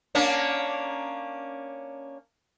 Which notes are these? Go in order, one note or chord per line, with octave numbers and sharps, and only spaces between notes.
A#3 C#4 D4